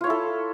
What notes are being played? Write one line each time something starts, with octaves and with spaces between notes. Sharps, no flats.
E4 F4 A4 C#5